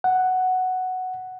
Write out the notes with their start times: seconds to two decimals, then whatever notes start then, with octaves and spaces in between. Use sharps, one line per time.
0.04 F#5